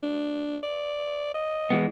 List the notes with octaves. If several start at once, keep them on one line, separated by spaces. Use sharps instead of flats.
D4
D5
D#5
E3 G#3 B3